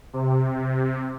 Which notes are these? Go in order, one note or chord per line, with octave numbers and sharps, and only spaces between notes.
C3